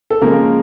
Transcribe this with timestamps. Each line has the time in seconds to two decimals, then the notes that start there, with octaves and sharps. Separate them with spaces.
0.10 A4
0.21 C#3 F3 G#3 A#3 A#4